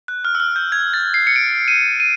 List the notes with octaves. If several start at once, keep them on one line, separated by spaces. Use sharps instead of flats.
F#6
F6
E6
F6
G6
G#6
A6
C7
C#7
D7
D#7
D#7